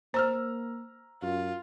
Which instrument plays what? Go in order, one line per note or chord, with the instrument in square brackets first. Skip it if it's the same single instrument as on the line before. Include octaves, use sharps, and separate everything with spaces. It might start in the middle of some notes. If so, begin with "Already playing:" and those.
[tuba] A#3 [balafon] C5 [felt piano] A#5 E6 F6
[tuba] F#2 [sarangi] F4